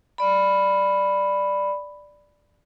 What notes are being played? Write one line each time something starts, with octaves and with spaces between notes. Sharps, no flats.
D5 B5